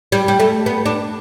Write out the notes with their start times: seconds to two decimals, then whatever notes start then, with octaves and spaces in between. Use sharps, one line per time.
0.12 G3
0.28 G3
0.40 A3
0.66 B3
0.86 D4